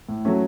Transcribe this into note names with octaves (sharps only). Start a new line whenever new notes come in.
A2
F#3 A3 C#4